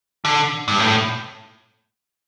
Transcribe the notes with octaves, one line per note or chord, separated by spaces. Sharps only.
D3
G2
A2